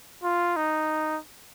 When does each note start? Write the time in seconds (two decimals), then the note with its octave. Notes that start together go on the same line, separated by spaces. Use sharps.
0.23 F4
0.57 D#4